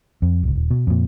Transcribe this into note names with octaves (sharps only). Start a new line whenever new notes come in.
F2
D1 C#2
D#1
B2
F2 A#2